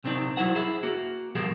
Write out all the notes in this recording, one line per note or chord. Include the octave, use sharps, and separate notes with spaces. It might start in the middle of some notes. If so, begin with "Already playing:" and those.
B1 C3 C4 D4 D#4
F#3 E4 C5 F#5
E4 G#4 C5
A#3 F#4
B2 F3 G3 A#3 G#4 A4